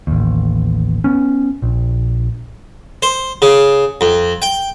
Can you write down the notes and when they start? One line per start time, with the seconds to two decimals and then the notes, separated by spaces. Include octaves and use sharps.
0.07 A1 D#2
1.04 B3 C#4
1.62 A#1
3.02 C5
3.42 C#3
4.01 F2
4.42 G5